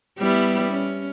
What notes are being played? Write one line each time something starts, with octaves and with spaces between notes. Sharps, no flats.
G3 B3 E4
C#4